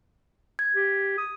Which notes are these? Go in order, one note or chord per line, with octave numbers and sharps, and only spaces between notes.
G#6
G4
D#6